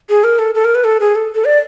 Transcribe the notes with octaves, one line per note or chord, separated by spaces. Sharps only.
G#4
A#4
A4
A4
A#4
B4
A4
G#4
A4
A4
D5